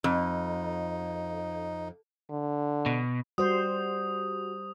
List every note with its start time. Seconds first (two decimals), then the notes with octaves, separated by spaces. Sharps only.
0.04 F2 D#4
2.30 D3
2.86 B2
3.38 G3 F#4 C5 D#6